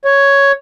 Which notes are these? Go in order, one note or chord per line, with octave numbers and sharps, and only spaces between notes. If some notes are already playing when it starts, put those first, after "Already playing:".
C#5